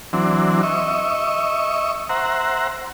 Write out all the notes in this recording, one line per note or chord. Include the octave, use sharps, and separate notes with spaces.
E3 F#3 C4 D4
D#5 E5 C#6
C5 E5 F#5 A#5